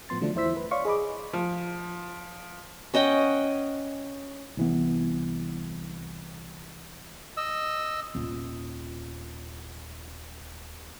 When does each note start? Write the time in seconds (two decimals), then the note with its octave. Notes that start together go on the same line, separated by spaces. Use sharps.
0.09 G1 A2 F3 B3 C6 A6
0.21 D3 F3 F#3 A3 D4
0.35 E2 E4 C5 E6 B6
0.57 B4
0.71 C#5 D5 F5 C6 C#6
0.85 G#4 D#5 B5 D6
1.33 F3
2.94 C#4 D#5 F#5 G5
4.57 C2 E3 B3
7.37 D#5 E6
8.15 D#1 F4